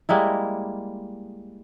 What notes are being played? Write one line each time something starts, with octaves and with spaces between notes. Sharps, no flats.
G3 G#3 A#3 E4